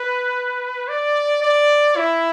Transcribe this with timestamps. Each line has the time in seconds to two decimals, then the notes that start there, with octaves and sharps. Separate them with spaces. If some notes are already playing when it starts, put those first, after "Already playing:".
Already playing: B4
0.88 D5
1.42 D5
1.97 E4